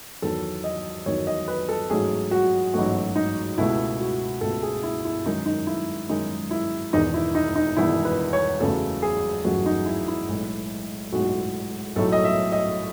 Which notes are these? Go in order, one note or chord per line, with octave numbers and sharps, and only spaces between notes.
E2 D#3 F#3 A4
D#5
E2 D#3 F#3 C#5
D#5
B4
A4
A1 G#2 F#3 A3 G#4
F#4
A1 G#2 F#3 A3 F#4
D#4
C#2 B2 A3 E4
F#4
C#2 B2 A3 A4
G#4
E4
E4
F#2 D#3 G#3 D#4
D#4
E4
F#2 D#3 G#3 D#4
E4
E1 E2 D#3 D#4
E4
D#4
D#4
E1 E2 D#3 E4
B4
C#5
F#1 E2 C#3 F#3 A3 A4
G#4
F#1 E2 C#3 F#3 A3 F#4
D#4
E4
E4
B1 A2 G#3
B1 A2 G#3 F#4
B1 A2 F#3 A3 A4
D#5
E5
D#5